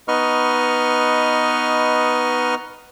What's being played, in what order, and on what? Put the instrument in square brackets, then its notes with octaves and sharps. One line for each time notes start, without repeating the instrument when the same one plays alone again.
[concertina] B3 D#4 B4 D#5 C#6 F6